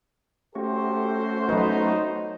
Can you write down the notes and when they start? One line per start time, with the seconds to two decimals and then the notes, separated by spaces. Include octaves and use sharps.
0.55 A3 C#4 F#4 G4 A4 C5
1.49 F#3 D#4 B4